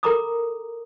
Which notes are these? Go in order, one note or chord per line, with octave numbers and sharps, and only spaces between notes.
A4 A#4 A#5 B5 D6 D#6